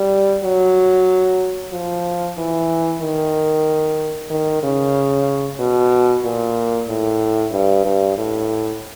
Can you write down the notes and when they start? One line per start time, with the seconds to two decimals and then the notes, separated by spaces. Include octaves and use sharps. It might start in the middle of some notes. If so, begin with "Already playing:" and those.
Already playing: G3
0.44 F#3
1.72 F3
2.38 E3
3.01 D#3
4.30 D#3
4.63 C#3
5.60 B2
6.24 A#2
6.88 A2
7.52 G2
7.85 G2
8.17 A2